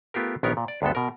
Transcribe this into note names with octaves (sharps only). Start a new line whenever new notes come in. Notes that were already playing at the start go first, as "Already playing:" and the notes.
A3 B3 F4 G4 A#4
A#1 D#3 B3 G4 A#4 C#5
A#2
D5
D2 G2 G#3 B3 A4
B2 A#4